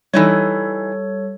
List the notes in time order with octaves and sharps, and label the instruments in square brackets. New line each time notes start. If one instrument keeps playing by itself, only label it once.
[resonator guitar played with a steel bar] E3 D#4 E4 [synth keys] G3 [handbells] A4 C#5